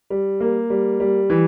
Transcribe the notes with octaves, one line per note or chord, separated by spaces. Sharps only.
G3
A#3
G3
G3
E3